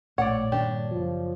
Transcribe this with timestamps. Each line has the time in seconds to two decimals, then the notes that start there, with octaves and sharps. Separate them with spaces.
0.18 A#1 A2 C#5 D5 F#5
0.52 G2 A#2 D#3 D4 G4
0.91 F#1 F3